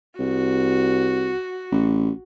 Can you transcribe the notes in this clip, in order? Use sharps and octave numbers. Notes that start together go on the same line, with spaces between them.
C2 F#4
A1